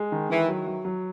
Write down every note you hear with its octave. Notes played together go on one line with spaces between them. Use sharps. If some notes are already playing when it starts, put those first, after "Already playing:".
Already playing: G#3
D#3
D#3 E3
F#3
F#3
F#3